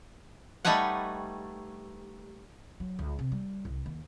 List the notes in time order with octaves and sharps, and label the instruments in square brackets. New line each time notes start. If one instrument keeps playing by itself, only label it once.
[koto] G3 A3 D#4 B4 C#5 F#5
[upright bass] F#3
C#2
C3
G3
C2
D#2